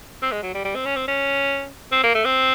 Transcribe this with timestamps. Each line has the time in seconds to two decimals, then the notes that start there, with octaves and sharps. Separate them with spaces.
0.22 C4
0.32 G#3
0.43 F#3
0.54 G3
0.65 G3
0.75 C4
0.86 C#4
0.96 C4
1.08 C#4
1.92 C4
2.03 A#3
2.14 A3
2.25 C4